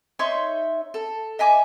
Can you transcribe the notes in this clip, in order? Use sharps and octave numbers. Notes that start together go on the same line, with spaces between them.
D#4 C#5 E5 C6
A4
D#5 E5 G#5 D6